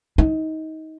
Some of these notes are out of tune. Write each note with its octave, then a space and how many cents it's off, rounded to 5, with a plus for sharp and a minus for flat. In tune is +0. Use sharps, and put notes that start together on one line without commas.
D#4 +25